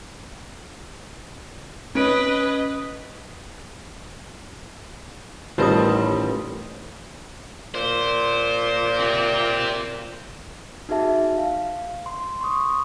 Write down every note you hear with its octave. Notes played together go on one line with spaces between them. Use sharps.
C#4 B4 D#5 D7
A1 D#3 G3 F4 B4 C5 A5 D#6
A#2 C5
C4 G4
D#4 F#4 G#4 E5 A5
F5
C6
C6 C#6 D#6